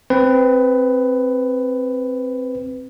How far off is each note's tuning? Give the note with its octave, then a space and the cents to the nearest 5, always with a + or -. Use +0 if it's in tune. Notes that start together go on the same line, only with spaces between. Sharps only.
C4 +5 B4 +15